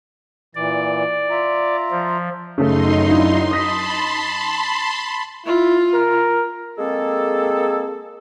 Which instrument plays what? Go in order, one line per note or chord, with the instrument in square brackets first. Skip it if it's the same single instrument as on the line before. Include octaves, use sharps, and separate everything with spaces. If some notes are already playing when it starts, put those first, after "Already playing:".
[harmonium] A#2 E3 [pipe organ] D5
[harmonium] F4 E5 A#5
[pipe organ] F3
[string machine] F#2 D#4 C6 [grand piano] C#3 A3 A4
[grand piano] D4 E4 F4
[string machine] A5 B5 C6 [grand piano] D#6 A#6 B6
[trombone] E4 [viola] F4
[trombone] A#4
[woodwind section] G#3 A#3 C4 G#4 A4